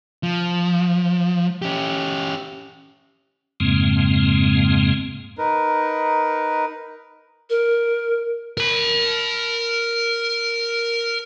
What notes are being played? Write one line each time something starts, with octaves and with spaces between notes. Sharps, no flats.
F3
C#4 G4
F2 G#2 C#3 G#3 A#3 C4
D#4 A#4 B4
A#4
A#4 B5